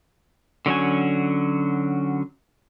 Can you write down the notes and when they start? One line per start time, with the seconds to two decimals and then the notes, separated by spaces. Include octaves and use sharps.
0.66 D3 F#3 C#4 F#4 G#5